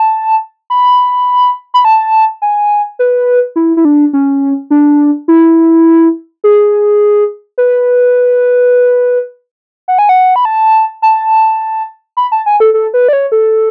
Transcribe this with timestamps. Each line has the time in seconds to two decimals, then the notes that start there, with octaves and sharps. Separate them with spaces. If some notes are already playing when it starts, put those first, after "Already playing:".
Already playing: A5
0.70 B5
1.74 B5
1.85 A5
2.42 G#5
2.99 B4
3.56 E4
3.77 E4
3.85 D4
4.13 C#4
4.70 D4
5.28 E4
6.44 G#4
7.58 B4
9.88 F#5
9.99 G#5
10.09 F#5
10.36 B5
10.45 A5
11.02 A5
12.17 B5
12.32 A5
12.46 G#5
12.60 A4
12.74 A4
12.94 B4
13.08 D5
13.13 C#5
13.32 A4